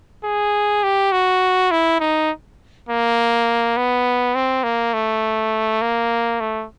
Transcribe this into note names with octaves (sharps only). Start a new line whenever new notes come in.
G#4
G4
F#4
E4
D#4
A#3
B3
C4
A#3
A3
A#3
A3